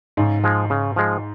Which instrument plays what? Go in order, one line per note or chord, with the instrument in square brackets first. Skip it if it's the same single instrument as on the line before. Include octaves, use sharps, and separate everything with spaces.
[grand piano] G#2 [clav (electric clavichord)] C#3
[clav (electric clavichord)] F3 G#3
C#3
F3 G#3